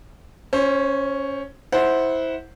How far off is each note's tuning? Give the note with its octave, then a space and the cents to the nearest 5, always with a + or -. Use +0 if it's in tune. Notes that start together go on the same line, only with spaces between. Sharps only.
C#4 +0 C5 +25
E4 -20 C5 +0 F#5 +0